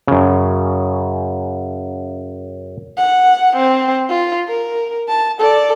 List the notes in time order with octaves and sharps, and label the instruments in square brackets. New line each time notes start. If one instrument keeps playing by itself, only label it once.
[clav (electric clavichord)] F#2 C#3
[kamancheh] F#5
C4
F4
A#4
A5
A4 D5